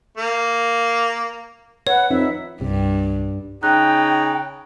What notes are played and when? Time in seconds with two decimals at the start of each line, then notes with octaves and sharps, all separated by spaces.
0.17 A#3
1.87 B4 C#5 F#5
2.11 F2 D#4 E5
2.61 C2 G2
3.63 C#3 D#4 G5 F#6